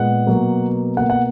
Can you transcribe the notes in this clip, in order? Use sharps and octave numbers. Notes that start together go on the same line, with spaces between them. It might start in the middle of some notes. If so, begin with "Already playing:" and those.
Already playing: A#2 G#3 B3 F#5
B2 F#3 A#3
B2 A#3 F#5
F#5